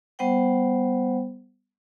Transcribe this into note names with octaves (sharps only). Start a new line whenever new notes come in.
G3 B3 C5 F#5 G5